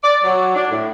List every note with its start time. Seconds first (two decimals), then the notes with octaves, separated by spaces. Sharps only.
0.03 D5
0.23 F#3
0.55 D4
0.70 A2